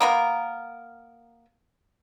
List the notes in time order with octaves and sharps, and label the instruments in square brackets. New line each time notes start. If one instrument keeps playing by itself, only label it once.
[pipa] A#3 B3 A#4